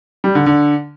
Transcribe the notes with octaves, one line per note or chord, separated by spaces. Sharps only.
G3
D3
D3